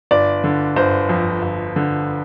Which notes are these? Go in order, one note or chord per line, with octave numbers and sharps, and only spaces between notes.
G1 D5
D3
G1 C5
F2
G1
D3